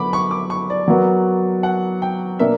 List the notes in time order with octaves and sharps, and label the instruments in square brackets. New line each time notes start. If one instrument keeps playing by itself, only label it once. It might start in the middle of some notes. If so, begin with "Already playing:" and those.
Already playing: [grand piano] D3 F#3 B3 [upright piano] B5 D6
[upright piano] C#6
D6
C#6
D5
[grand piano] F#3 B3 F#4 A#4
[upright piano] F#5
G5
[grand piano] B2 A#3 D4 A#4 [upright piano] E5